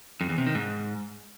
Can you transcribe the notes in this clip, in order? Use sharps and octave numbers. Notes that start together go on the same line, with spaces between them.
F2
E2
C3
D#3
G#2